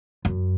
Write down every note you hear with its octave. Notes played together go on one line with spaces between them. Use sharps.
F#2